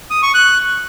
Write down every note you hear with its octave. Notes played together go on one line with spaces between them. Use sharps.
D#6
C#6
F#6